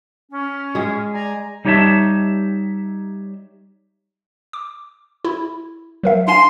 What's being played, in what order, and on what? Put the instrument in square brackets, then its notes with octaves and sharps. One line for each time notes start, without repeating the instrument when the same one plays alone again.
[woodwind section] C#4
[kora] G#3 G#4
[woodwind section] D5 G#5 A#5
[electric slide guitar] G3 D#4 G4 C#5 E5 A5
[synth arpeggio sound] D6
E4
F#3 A#4 E5
[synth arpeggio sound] D4 F5 G#5 [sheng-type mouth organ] C6